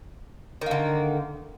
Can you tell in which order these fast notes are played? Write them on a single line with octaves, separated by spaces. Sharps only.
D#3 A#3 D3